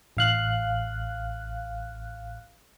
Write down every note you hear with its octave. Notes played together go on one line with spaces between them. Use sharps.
A1 F5 F#6